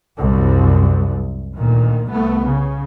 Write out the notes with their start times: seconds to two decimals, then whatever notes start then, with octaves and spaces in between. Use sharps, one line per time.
0.18 C2 F#2
1.57 D2 A#2 D#3
2.09 C2 A3 B3
2.48 C#3